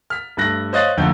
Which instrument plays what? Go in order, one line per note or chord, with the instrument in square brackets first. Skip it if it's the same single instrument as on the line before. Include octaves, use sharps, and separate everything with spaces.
[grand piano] F6 B6
G2 A3 F#6 A#6
C5 C#5 D#5 F5 F#6 A6
F2 D3 A3 A#3 G6